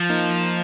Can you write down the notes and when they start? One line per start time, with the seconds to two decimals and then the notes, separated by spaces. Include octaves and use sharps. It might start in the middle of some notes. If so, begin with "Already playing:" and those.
Already playing: F3
0.10 A#3 D#4